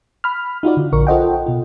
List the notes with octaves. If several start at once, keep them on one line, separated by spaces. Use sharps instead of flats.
B5 F6
D#4 F4 F#4 D5
D3
A#1 A#4 C#6
F4 A4 C5 D#5 F#5 G5
B2 F4